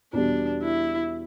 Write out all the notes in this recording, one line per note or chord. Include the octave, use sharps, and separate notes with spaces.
E2 B2 G3 D4
E4